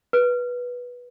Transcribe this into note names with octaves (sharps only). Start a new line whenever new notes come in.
B4